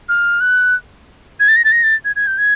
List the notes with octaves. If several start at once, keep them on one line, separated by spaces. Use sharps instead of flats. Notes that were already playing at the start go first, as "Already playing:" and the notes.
F6
F#6
G#6
A6
A#6
A6
A#6
A6
G#6
G#6
G6
G#6